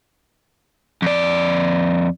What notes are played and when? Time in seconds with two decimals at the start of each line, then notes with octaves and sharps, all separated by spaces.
1.02 F2 D5